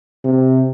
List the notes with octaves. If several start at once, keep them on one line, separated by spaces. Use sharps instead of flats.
C3